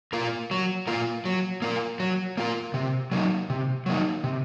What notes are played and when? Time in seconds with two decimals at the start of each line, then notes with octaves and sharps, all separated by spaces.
0.13 A#3 F4 A#4
0.51 F#3
0.87 A#3 F4 A#4
1.25 F#3
1.62 A#3 F4 A#4
2.00 F#3
2.37 A#3 F4 A#4
2.74 C3
3.12 F#3 A#3 D#4
3.50 C3
3.86 F#3 A#3 D#4
4.24 C3